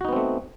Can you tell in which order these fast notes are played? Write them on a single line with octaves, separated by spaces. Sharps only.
F#4 D#4 B3 C4 A3